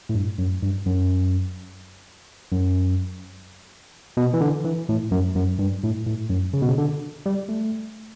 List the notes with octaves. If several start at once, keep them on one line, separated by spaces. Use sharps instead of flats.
A2
G2
F#2
G2
F#2
F#2
B2
E3
D3
E3
A2
F#2
F#2
G2
A2
A2
F#2
C#3
B2
C#3
D3
G3
A3